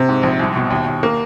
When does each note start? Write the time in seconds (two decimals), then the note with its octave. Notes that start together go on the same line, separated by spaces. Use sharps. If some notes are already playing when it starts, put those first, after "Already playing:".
Already playing: C3
0.09 G#2
0.23 A#1
0.40 C2
0.56 B2
0.70 D#2
0.87 D#2
1.03 A#3